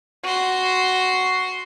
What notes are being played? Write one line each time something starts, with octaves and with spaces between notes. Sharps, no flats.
F#4 C6